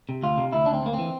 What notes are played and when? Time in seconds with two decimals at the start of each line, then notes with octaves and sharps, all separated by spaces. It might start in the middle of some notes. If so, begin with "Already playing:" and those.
0.09 C3
0.23 D2 F4
0.38 C3
0.52 D2 E4
0.66 D4
0.69 D2
0.74 C4
0.82 D2 A#3
0.93 C4
0.99 E3